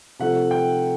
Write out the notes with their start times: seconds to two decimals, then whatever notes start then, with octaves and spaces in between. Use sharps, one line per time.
0.19 C3 F3 A3 F#5
0.51 G5